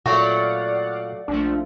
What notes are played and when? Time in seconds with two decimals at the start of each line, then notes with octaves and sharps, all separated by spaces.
0.06 A#2 F#3 A3 F#4 D5 F5 F#5
1.28 A#1 F3 A3 D4